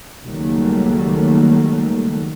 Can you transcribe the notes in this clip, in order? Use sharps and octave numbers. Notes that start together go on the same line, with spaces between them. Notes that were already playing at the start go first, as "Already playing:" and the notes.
C#2 D#3 F#3 G3 A3 A#3